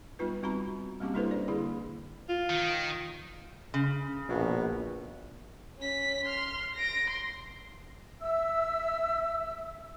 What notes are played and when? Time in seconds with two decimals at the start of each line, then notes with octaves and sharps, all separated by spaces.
0.19 G3 B3 D#4 F4 B4
0.43 G3 C4 F#4 A#5 B5
1.00 G3 A#3 C4 C#4 F#4 G4
1.14 G3 D4 E4 A4 B4 C5
1.31 D5
1.48 D3 A#3 E4 G#4 B5
2.29 F4
2.50 D#3
3.74 C#3
4.29 A#1 B2
5.78 C#4 B6
6.25 C6 F6
6.74 A#6 D7
7.10 C6
8.21 E5 E6